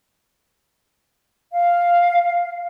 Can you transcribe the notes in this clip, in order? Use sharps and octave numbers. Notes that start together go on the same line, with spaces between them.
F5